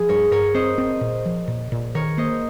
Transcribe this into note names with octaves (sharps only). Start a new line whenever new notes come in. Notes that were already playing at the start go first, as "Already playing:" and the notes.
Already playing: F3 G#4
G2 A#4 C#5
G2 A#4 C#5
C4 C5 D#5
C4
A#2
F3
A#2
A#2
D#3 A#4 C#5
A#3 C5 D#5